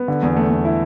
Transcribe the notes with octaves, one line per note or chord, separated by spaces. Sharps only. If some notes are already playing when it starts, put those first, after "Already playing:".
Already playing: B3
D3
E2
A3
A3
E4